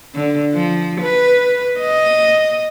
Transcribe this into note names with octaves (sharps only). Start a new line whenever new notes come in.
D3
F3
B4
D#5